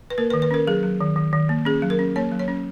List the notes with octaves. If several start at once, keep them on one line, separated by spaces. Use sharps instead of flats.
B4
A#3 A#4
B4
D#3
B4
C#4 A#4
F#3 G#4
F#3
D#3
D#3
D#3
A#3
C#4 G#4
F#3
A#4
C#4
A#3 C#5
F#3
C#5
C#4